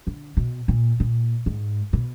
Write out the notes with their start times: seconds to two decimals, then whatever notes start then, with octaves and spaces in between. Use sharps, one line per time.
0.07 D3
0.37 B2
0.68 A#2
1.00 A#2
1.46 G#2
1.93 B2